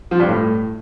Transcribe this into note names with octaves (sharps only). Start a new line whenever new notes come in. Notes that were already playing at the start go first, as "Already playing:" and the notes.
F3
G2
A2